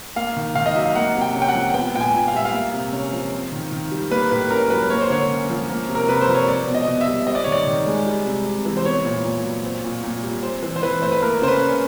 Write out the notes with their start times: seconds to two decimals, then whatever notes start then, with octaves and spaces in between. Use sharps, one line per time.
0.16 A#3 F5
0.37 D#3
0.55 D#3 F5
0.66 D#5
0.76 F#3 E5
0.86 F5
0.95 A#3 F#5
1.15 C3
1.21 G5
1.35 C#4
1.42 G5
1.48 F#5
1.55 F3
1.74 B3 G5
1.94 A#2 G5
2.00 G#5
2.14 A#2
2.28 F5
2.33 G3 E5
2.45 F5
2.53 A#3
2.73 C3
2.93 C#4
3.12 F3
3.32 C4
3.52 D#3
3.72 D#3
3.91 G3
4.11 A#3 B4
4.31 A2 B4
4.50 C#4 A#4
4.70 F#3 B4
4.90 A#3 C#5
5.01 C5
5.10 D3 C#5
5.30 C#4
5.50 F3
5.69 A#3
5.89 C3
5.95 A#4
6.09 C3 B4
6.21 C5
6.28 F3
6.34 C#5
6.48 C4 D5
6.67 B2
6.75 D#5
6.87 B2
7.01 E5
7.08 G3
7.27 C4 D#5
7.35 D5
7.44 D#3 C#5
7.52 D5
7.67 D#3
7.86 G#3
8.06 G3
8.26 C3
8.46 C3
8.65 E3
8.77 C5
8.85 B3 C#5
9.05 A#2
9.25 A#2
9.44 F#3
9.64 C4
9.84 A#2
10.03 A#2
10.23 G3
10.43 C4 C5
10.63 E3
10.76 C5
10.82 E3 B4
11.02 A3 C5
11.12 B4
11.22 A#3 A#4
11.42 C#3 C5
11.48 B4
11.61 C#4